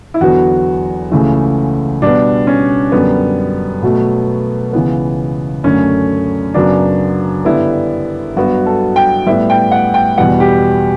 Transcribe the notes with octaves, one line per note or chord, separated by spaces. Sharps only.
E4
E2 D3 F#3 B3 F#4
C#2 C#3 E3 A3
B2 G3 B3 D4
C#4
F#2 D3 G3 B3
B2 F#3 A3
C#2 C#3 E3 B3
F#2 D3 A3 C#4
F#2 C#3 F#3 B3 D4
G2 D3 G3 B3 E4
G2 F#3 B3 F#4
A4
G5
A2 G3 B3 E5
G5
F#5
G5
E2 B2 G3 B3 F#5
G4